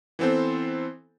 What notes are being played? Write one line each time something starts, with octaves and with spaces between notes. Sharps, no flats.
E3 B3 C4 A4 C5